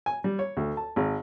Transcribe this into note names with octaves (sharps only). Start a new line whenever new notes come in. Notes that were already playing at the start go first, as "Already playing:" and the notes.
G#5
G3
C#5
D2
A5
G#1